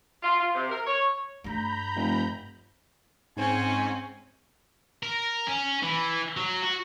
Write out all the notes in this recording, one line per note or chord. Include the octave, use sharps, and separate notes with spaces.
F4
F4
C3
A#4
C#5
G2 A3 A#5 B5 G6
F1
G#2 C4 C#4 C5 G#5
A#4
C#4
E3
F#3
F#4